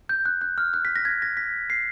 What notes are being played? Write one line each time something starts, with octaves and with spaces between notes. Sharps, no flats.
G6
F#6
F#6
F6
F#6
B6
A#6
G#6
A#6
B6
C7